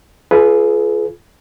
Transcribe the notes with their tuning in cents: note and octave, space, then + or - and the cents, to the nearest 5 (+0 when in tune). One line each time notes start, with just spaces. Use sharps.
F4 -10 G#4 +40 B4 +0